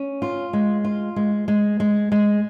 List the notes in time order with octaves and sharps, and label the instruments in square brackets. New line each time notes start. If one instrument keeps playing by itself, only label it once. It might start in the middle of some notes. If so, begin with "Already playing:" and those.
Already playing: [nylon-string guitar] C#4
F4
G#3
F4
G#3
G#3
G#3
G#3